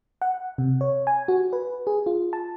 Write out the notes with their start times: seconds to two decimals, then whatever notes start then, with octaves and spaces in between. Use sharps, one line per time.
0.22 F#5
0.58 C3
0.81 C#5
1.07 G#5
1.28 F#4
1.53 B4
1.87 G#4
2.06 F4
2.33 A5